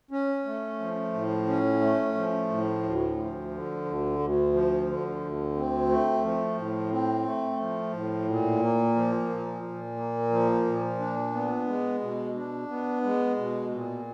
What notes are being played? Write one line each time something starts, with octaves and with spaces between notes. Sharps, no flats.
C#4
A3
F3
A2
C#4
A3
F3
A2
D2
F3
D3
D2
D2
F3
D3
D2
C4
A3
F3
A2
C4
A3
F3
A2
A#2
A#3
F3
A#2
A#2
A#3
F3
A#2
D4
B3
G#3
B2
D4
B3
G#3
B2
A#2